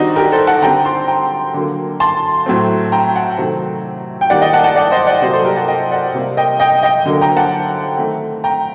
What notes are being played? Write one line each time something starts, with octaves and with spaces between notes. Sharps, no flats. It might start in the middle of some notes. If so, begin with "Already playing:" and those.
Already playing: D#3 G3 C4 D4 D#4 F#4
G4 A#4
A4 C5
F#5 A5
D3 G3 C4 G5 A#5
A5 C6
G5 A#5
D3 F#3 A#3
A5 C6
A2 F#3 A3 C4
G5 A#5
F#5 A5
C3 D#3 F#3 A3 C4
G5
D#3 G3 A#3 D5 F#5
D#5 G5
F#5 A5
F#5 A5
D5 F#5
C5 D#5
D5 F#5
C3 F#3 A#3 C5 D#5
A4 C5
G4 A#4
F#5 A5
D#5 G5
D5 F#5
C3 G3 A#3
D#5 G5
D#5 G5
D#5 G5
D3 F#3 A#3
G5 A#5
F#5 A5
D#3 A3 C4
G5 A#5